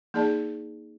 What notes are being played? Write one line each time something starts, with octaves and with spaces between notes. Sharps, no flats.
A#3 D#4 G#4 D5 A5